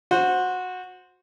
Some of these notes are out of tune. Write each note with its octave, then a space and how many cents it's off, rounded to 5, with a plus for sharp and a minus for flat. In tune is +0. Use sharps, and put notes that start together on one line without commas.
F#4 -15 C5 +0